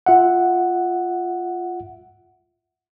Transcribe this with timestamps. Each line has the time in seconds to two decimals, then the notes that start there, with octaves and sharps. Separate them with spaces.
0.06 F4 E5 F#5